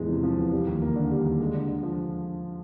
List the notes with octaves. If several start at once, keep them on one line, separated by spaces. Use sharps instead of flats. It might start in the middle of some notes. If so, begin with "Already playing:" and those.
Already playing: E2 A2 F3 G#3
C3
F3
E2
G3
D#2
A#3
D3
G3
D#2
G#3
D3
D3
F3